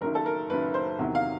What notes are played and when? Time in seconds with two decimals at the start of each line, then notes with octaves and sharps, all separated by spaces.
0.01 F#1 F#2 D#3 A#4
0.15 A4
0.26 A#4
0.50 F#1 F#2 D#3 B4
0.74 C5
0.99 E2 C3 D#3 F#3
1.15 F5